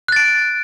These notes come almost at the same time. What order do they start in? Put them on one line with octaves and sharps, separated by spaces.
F#6 A6 D7